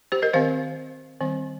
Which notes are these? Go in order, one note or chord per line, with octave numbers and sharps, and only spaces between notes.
G4 C5
A#4 D#5
D#3 C4 C5 F5
D#3 G3 C4